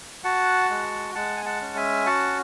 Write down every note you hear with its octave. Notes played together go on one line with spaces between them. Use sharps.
F#4 F#5 A5
G#3
G#3 F#5 A5
G#5
F#5 A5
C#4
E5 G#5
F#4 F#5 A5